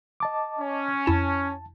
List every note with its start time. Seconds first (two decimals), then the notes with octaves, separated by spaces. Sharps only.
0.20 D#5 A5 D6
0.59 C#4
1.06 F2 E4 A5 E7